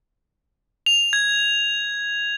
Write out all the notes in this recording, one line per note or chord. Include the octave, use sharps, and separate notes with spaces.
F7
G#6